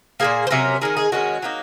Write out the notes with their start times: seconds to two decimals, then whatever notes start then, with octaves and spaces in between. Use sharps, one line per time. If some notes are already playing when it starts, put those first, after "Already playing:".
0.20 A#2 F3 A#3 G#4
0.47 C5
0.51 C3 F#3 C#4 A#4
0.82 D#3 G#3 D#4 A#4
0.97 G#4
1.12 D#3 G#3 C#4 F#4
1.42 F#3 A#3 D#4